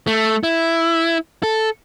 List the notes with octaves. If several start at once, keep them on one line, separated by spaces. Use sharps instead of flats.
A3
E4
A4